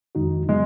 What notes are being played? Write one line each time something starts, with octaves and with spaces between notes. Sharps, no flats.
F2 D#3 G#3 D#4 F#4
C#3 F#3 G#3 B3